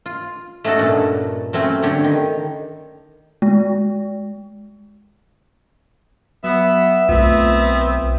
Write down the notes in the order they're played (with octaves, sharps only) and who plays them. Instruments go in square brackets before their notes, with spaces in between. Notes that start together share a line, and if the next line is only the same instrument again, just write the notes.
[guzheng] F4
A3 C#4 D#4 F#4 A4
G2 A#2
F#3 A3 C4 C#4
D3 G4 C#5
D#3
[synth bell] G#3
[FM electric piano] F#3 [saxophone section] B3 [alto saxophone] E5
[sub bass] B1 [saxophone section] D#3 B3 C4 [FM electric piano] A3 F4